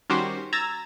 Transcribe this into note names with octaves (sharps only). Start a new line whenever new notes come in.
D#3 G3 C#4 F#4 G4 C5
A#5 E6 G#6 A6